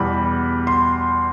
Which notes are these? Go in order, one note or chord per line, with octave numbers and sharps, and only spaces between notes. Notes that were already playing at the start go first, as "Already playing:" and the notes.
Already playing: E2 B2 G3 B5
C6